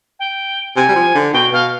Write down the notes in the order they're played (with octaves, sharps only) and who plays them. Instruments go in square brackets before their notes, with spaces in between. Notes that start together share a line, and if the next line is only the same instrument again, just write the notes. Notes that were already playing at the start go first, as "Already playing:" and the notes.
[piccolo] G5
[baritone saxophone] C3 [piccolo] G#5
[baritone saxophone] G3
F3
D3
[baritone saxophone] B2 [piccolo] G5
[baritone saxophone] B2 [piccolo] F5